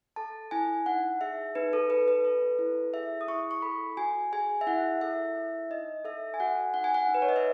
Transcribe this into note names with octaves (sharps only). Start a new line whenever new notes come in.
A4 A5
E4 G#5
D#4 F#5
G#4 E5
D#4 B4
A4
A4 B4
B4
A4
E4
G#4 E5
D#6
E4 C#6
C#6
A4 B5
F#4 G#5
G#4 G#5
E5
E4 F#5
A4 E5
E4
D#4 D#5
A4 E5
G#5
F#4 F#5
D#4 F#5
G#5
F#5
D#4
B4
C#5
D#5
E5